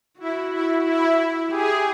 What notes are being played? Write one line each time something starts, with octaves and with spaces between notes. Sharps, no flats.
E4 F#4
E4
E4
G4 G#4